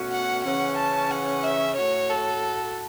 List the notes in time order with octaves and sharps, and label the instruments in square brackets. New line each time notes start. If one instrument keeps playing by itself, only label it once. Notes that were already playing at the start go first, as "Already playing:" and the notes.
Already playing: [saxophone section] B2 A3 C#4 F#4
[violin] F#5
[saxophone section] C#3 E3 C#4 [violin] F#5
[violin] A5
F#5
E5
[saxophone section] A2 A3 F#4 [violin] C#5
[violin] A4